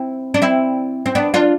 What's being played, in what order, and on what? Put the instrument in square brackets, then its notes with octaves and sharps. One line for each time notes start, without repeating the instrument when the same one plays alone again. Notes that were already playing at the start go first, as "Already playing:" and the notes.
Already playing: [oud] C4 E4
D4
C4 E4
C4
B3 D4
D4 F4